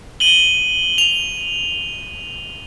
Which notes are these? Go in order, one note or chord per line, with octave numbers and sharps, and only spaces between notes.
D#7 F#7 G7
F7